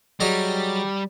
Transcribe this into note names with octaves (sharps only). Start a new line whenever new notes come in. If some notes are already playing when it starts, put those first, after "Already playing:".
F#3 G3 G#4 D#5